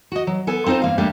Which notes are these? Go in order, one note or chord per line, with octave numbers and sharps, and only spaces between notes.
F#4 D#5
F#3
B3 A4 G#5
C4 D#4 F4 C5 A5
G2 A#3 F5
G3 A3 A#3 D4 G4